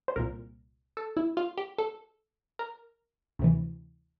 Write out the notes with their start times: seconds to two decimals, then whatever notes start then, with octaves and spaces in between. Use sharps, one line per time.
0.08 C5
0.16 C2 A#2 A#4
0.97 A4
1.17 E4
1.37 F4
1.58 G4
1.78 A4
2.59 A#4
3.39 D2 C3 E3